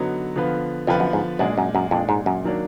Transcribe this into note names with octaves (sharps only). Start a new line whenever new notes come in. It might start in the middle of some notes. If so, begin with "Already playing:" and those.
Already playing: F#2 D3 F#3 B3 D#4 F#4
D3 F3 B3 F4 B4
F2 D3 F3 B3 F4 B4
F#2
G#2
F#2 A#2 G#3 D4
F#2
F#2
F2 A#2 G#3 D4
G#2
F#2
D#3 F#3 A#3 D4